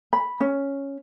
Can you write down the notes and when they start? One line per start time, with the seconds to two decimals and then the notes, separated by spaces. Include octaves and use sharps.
0.13 B5
0.40 C#4